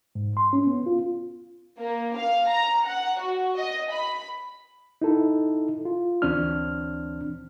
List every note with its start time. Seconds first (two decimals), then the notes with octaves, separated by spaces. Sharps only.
0.15 G#2
0.37 C6
0.53 C#4
0.67 B3
0.86 F4
1.79 A#3
2.17 F5
2.48 A#5
2.86 F#5
3.21 F#4
3.56 D#5
3.91 B5
5.02 D#4 E4 A4
5.85 F4
6.22 D2 E3 C4 D4 F6